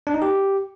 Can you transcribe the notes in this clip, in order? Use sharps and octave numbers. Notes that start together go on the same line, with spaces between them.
D4
D#4
G4